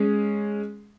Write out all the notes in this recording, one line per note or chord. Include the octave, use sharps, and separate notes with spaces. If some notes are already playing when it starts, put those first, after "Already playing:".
Already playing: G#3 C#4 G#4